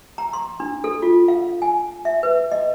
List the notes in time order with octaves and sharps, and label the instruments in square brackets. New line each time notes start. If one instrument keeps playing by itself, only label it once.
[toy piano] A#5
C6
D4
A4
F4
F5
G#5
E5
B4
D#5